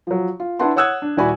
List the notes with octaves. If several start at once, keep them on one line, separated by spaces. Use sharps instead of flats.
F3 F#3
F4
D4 E4 B4 F#5 A5 C6
C#5 F#5 D#6 E6 F#6 G#6
D4
D#1 E4 F#4 D5 G#5 B5